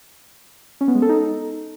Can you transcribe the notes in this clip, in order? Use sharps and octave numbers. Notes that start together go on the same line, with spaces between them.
C#4
B3
G#3
A4
D#4